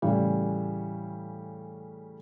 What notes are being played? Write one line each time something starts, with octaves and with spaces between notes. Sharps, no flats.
A2 C#3 E3 G3